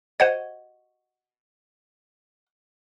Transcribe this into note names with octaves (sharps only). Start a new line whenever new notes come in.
F#4 C5 D#5 F#5 G#6